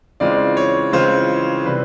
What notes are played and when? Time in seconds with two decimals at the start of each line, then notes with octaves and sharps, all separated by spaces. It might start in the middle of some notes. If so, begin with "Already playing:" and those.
0.20 C#3 E3 G#3 C4 F4 D5
0.57 C#5
0.93 C#3 E3 G#3 C4 F4 C5
1.65 C3 E3 G3 B4